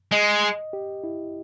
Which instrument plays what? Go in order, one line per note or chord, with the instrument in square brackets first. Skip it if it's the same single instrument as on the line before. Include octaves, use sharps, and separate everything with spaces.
[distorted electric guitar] G#3 [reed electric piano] D#5
[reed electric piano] G4
E4